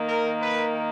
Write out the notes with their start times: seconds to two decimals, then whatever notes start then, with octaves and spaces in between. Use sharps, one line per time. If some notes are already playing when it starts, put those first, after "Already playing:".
Already playing: D#3 A#3
0.09 A#4
0.42 B4